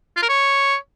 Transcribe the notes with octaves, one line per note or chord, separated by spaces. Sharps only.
F4
A#4
C#5